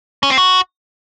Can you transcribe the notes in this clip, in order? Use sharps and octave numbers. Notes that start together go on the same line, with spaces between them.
C#4
C4
F#4